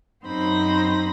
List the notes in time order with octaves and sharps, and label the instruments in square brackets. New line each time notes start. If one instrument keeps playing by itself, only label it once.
[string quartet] F#2 C4 D#4 C5 B5 A#6